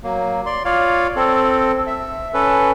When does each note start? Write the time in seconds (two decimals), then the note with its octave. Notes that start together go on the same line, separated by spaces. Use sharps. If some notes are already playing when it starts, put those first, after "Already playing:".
0.04 F#3 A#3
0.46 D5 C6
0.65 F4 C#5 D5 F5
1.16 C4 A4
1.87 E5
2.34 C#4 A4 B4